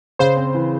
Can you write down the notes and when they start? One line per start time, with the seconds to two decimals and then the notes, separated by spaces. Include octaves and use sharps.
0.19 C#3 C5
0.37 C4
0.55 E3